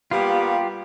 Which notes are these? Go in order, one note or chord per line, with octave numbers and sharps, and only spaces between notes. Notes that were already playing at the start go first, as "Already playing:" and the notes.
G3 A#3 B3 F4 G4